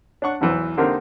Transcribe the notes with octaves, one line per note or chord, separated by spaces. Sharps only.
D4 C#5 F#5 C#6
B1 E2 E3 C5
D3 A#3 C4 D#4 G4 A#4